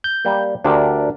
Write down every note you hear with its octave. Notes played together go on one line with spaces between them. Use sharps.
G6
G3 A#3
D2 D4 G4 A#4 E5